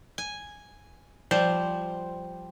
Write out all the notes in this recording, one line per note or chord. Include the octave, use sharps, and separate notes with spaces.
G#5
F3 G3 C5